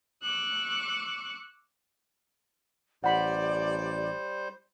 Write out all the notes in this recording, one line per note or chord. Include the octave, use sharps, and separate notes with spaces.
C#6 D6 E6 F#6
A1 G3 C5 D5 F#5 B5